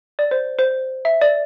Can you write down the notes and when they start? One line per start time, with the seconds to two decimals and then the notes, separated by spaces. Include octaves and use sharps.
0.19 D5
0.31 C5
0.59 C5
1.05 E5
1.21 D5